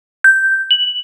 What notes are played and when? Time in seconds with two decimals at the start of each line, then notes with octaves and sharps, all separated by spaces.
0.24 G6
0.71 F#7